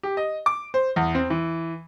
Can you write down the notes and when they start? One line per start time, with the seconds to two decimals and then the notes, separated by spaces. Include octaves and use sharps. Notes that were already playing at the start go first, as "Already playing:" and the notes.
0.03 G4
0.17 D#5
0.46 D6
0.74 C5
0.96 E2
1.15 C4
1.30 E3